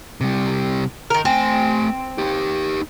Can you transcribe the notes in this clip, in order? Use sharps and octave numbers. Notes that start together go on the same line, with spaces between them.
C3 G3
D#3 A#4
A3 C4 G#5
D#4 G4